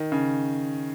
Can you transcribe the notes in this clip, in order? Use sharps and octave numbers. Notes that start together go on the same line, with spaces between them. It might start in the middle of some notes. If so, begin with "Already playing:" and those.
Already playing: D#3
C#3